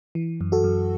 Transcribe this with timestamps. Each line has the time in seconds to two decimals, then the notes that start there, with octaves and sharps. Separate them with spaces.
0.15 E3
0.41 F#2
0.52 F#4 A4
0.64 F#2